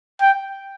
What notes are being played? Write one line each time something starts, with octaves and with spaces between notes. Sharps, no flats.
G5